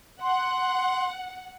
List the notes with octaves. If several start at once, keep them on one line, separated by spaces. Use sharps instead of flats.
F#5 C6